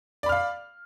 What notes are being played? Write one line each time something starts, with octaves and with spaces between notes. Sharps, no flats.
D5 F5 B5 F6